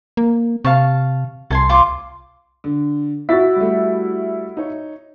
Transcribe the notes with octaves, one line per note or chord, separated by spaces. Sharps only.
A#3
C3 F5 A5 C#6
C2 A4 G#5 C6
F4 C6 D6
D3
E4 F#4 C#6 A6 B6
G3 A3
D#4 C#5